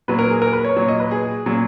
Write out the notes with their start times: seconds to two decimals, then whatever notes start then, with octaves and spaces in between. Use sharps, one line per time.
0.08 A#2 F#3 B4
0.19 A#4
0.30 G#4
0.42 A#4
0.53 B4
0.64 C#5
0.76 A#2 F#3 C#5
0.88 D#5
1.00 B4
1.11 G#4
1.46 A#2 F#3